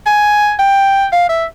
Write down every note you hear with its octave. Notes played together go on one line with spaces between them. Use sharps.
G#5
G5
F5
E5